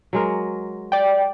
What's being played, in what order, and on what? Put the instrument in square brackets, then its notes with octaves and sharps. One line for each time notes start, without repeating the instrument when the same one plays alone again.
[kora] F#3 G#3 A#4
[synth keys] D5 G5